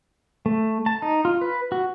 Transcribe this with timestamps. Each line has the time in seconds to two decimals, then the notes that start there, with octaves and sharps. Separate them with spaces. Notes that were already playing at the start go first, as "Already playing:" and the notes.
0.46 A3
0.86 A5
1.02 D#4
1.25 F4
1.41 B4
1.72 F#4